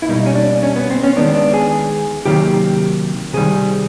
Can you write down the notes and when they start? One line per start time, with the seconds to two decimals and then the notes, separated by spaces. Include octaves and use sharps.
0.02 E4
0.09 B2 G3 A#3 D#4
0.26 C#4
0.35 D4
0.63 C#4
0.76 B3
0.90 C4
1.03 C#4
1.16 D#3 G#3 B3 D4
1.35 D4
1.53 G#4
2.25 C3 D#3 F#3 A#3 G4
3.33 C3 D#3 G3 G#4